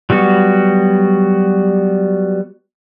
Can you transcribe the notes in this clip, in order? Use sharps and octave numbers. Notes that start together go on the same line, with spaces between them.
F#3 G3 B3 F#4